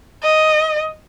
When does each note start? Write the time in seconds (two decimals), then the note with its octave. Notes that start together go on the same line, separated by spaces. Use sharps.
0.23 D#5